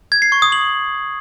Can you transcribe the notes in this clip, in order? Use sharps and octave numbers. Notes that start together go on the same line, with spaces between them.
G#6
C7
C#6
D#6
F#7